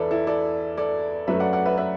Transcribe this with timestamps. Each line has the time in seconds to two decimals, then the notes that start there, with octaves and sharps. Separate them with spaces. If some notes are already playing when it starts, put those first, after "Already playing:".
Already playing: E2 A4 B4 D5 E5
0.11 E4 A4
0.27 A4 D5
0.78 A4 D5
1.27 F#2 F#3 A3 B4 E5
1.40 D5 F#5
1.53 D5 F#5
1.66 B4 E5
1.78 B4 E5